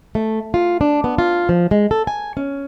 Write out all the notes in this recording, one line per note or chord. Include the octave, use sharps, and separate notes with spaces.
A3
F4
D4
B3
F4
F3
G#3
A4
G#5
C#4